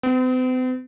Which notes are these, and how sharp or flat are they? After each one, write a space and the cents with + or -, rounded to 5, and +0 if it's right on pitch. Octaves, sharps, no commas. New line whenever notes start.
C4 -45